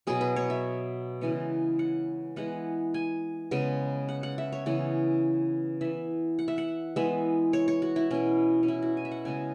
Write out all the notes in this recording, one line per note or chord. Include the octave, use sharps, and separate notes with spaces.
B2 F#3 B3 G#4
B4
C#5
E5
C#3 E3 G#3 B3
F#5
E3 G#3 B3 F#5
G#5
C#3 G#3 B3
F#5
F#5
E5
C#5
C#3 E3 B3 C#5
E3 B3 E5
F#5
E5
F#5
E3 G#3 B3 E5
C#5
C#5
F#4
E4
B2 B3 C#4
C#4
E4
F#4
G#5
E5
F#5
C#3 G#3 B3 G#5